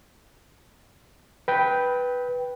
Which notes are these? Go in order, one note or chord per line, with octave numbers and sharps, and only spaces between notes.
B4 G5